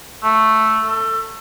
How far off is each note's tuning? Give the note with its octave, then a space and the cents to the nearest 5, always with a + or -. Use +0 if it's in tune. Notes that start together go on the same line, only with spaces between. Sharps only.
A3 +0
A4 +25